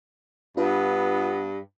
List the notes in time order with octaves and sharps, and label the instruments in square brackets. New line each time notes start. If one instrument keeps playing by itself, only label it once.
[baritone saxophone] G2 [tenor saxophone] B3 [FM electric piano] D4 F4 B4